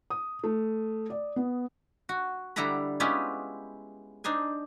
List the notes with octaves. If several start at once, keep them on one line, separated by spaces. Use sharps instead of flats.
D#6
A3
D5
B3
F#4
D3 G3 E4 F#5 A#5 B5
G#3 B3 C#4 E4 F4 G4
D4 D#4 C5 G#5